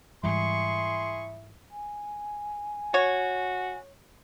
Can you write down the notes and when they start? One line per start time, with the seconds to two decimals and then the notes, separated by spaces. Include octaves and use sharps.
0.24 G#2 E3 G3 E4 G#4 C6 C#6
1.71 G#5
2.94 F#4 C#5